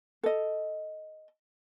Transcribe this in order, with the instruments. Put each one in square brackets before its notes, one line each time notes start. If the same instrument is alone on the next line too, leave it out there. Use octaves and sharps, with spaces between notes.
[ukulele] A4 D#5